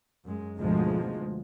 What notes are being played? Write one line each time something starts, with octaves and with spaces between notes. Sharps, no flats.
F#2 G#3
D2 G#2 B2 F3 G#3